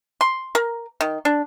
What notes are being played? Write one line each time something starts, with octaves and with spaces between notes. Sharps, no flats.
C6
A#4
D#3
D4